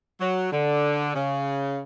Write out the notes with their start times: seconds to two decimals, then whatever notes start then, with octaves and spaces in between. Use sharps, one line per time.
0.21 F#3
0.52 D3
1.15 C#3